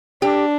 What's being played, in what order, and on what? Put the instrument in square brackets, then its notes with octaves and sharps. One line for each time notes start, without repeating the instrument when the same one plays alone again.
[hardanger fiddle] D4 [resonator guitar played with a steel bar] G4